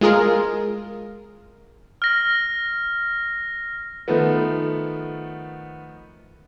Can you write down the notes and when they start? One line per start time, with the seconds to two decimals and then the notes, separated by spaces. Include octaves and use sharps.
0.01 G#3 F4 G#4 A#4
2.02 F6 A#6
4.08 D#3 F3 A3 B3